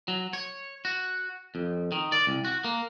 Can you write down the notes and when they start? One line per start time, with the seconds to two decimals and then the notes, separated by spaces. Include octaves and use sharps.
0.08 F#3
0.33 C#5
0.85 F#4
1.55 F2
1.92 D#3
2.12 D5
2.27 C2
2.45 F#4
2.64 A#3